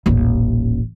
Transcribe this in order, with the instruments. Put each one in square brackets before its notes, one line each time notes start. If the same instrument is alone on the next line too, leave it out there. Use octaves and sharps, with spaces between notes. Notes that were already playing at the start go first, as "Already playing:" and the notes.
[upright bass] D#1 A1